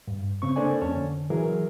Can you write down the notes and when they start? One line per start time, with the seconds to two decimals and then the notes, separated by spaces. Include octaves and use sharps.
0.08 G2
0.42 C#3 C4 C#6
0.56 A#3 D4 A4 C5 D5 G#5
0.81 F2 C#4 C#5 A5
0.96 D3
1.30 E3 F#3 G#4 A#4